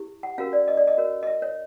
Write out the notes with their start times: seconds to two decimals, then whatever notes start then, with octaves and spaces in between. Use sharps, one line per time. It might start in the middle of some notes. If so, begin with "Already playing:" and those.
Already playing: E4 G4
0.23 F#5
0.38 C#4 F#4 A#4 F5
0.53 D5
0.68 D#5
0.77 D5
0.87 D#5
0.97 F#4 A#4 C#5
1.23 D#5
1.27 E5
1.42 C#5